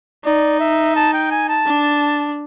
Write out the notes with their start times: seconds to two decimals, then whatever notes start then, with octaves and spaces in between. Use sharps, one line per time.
0.24 D#4 D5
0.60 E5
0.96 A5
1.14 G5
1.31 G#5
1.49 A5
1.66 D4